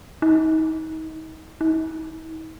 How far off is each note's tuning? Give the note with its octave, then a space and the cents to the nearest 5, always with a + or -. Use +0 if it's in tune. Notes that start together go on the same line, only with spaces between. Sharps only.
D#4 +35
D#4 +45